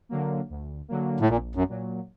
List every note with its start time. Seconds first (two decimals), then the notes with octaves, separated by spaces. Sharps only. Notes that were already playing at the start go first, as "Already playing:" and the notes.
0.09 D3 F#3 A#3
0.50 D2
0.88 D3 F#3 A#3
1.20 A2
1.29 A#1 A#2
1.55 F#2
1.69 A#2 F#3